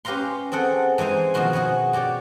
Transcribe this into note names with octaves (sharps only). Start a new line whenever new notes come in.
C#4 G4 B4 F5 A#5 C6
C4 G#4 A4 F#5 G5
E3 G#3 D#4 C5 G#5
B2 D#3 F3 F#4 C6
F#4 G#4 B4 C#5
F#4 G4 C#5 D5